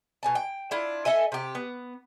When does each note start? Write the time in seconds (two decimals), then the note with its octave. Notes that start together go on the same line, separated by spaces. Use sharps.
0.23 B2 G#5 A5
0.35 G5
0.71 D4 E4 F4
1.05 A4 D#5 E5 G#5
1.32 C3 G4
1.55 B3